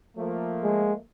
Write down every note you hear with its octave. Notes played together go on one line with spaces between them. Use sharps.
F3 A3 A#3
G#3